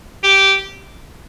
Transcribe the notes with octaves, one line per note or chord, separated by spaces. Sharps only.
G4